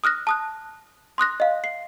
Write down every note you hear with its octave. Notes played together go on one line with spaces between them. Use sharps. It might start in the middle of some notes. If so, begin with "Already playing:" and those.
D#6 F6 F#6 A#6
A5 D#6 F#6
C6 D#6 F#6 A#6
D#5 F5
C7